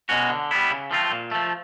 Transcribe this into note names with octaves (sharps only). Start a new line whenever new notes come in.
B2 G#3 C#4 F#4
D3
G3 B3 E4
C#3
F3 A3 C4 F4
A#2
F3 A3